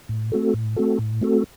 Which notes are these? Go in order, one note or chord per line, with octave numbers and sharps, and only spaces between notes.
A2
A3 C4 F#4 A4
A2
A3 C4 F#4 A4
A2
A3 C4 F#4 A4